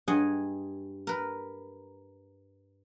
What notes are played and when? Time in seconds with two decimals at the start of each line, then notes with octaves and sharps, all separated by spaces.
0.08 G2 G#4 D#5 F#5 G#5
1.07 A#4 B4